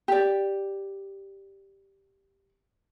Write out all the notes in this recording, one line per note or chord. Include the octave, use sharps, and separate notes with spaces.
G4 D5